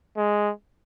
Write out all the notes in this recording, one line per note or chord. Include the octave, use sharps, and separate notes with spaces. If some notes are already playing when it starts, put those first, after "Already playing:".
G#3